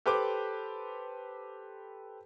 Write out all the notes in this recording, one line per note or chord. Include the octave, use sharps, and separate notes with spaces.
G4 A4 B4 C5 D6